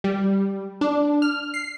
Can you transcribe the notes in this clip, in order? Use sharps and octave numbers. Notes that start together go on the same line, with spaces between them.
G3
D4
F6
C7